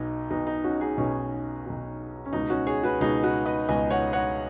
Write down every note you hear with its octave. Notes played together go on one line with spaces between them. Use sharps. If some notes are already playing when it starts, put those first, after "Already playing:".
Already playing: B1 B2 D#4
B1 B2 D#4
D#4
C#4 F#4
D#4 G#4
B1 B2 C#4
B1 B2
C#4
C#2 B2 D#4
C#4 F#4
G#4 C#5
F#4 B4
C#2 B2 D#4 G#4
F#4 B4
B4 D#5
C#2 B2 D#5 G#5
C#5 F#5
C#5 F#5